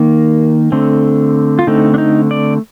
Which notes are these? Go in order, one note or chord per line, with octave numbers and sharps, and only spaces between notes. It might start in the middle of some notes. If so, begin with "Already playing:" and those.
Already playing: D#3 A#3 D#4
D3 A3 C4
F4
D3 A3 C4 D#4
D4
D#4
D5